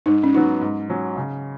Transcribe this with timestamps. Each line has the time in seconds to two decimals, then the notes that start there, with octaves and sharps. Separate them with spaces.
0.06 G#2 D#4
0.24 C#4
0.34 F#3 B3 D#4 F#4
0.61 G#2
0.90 F#3 C#4
1.17 C#3